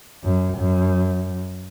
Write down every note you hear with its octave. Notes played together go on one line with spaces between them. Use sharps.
F#2
F#2